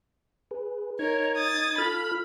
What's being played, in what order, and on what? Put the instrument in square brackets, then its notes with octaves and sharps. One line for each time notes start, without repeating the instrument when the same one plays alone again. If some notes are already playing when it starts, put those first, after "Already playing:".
[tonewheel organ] G#4 B4
[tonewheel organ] D#4 G#6 [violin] A#4 C#5
[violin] D#6 A6
[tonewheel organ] F4 A4 F6 [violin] B5